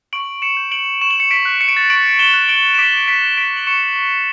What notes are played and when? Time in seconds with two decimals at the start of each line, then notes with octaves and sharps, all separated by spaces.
0.13 C#6 D7 F#7
0.42 C#7 E7
0.57 G6
0.71 D7 F#7
1.01 C#6 E7
1.11 F#7
1.20 C#7 E7
1.31 B6 D7
1.45 F#6
1.61 C#7
1.68 D7
1.77 A6 C#7
1.90 C#6 D7 F#7
2.19 E7 G7
2.34 F#6
2.48 D7 F#7
2.74 E7
2.78 D6 B6 D7
3.08 B6 D7
3.22 F#6
3.37 B6 D7
3.57 F#7
3.67 C#6 C#7 E7